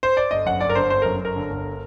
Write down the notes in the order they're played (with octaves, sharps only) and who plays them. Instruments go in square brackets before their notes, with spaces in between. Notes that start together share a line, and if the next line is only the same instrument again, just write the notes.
[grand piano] C5
D5
G1 D#5
F#2 F#5
G1 D5
A#4
D3 C5
G1 C5
F#2 A#4
G1 A#4
D3
G1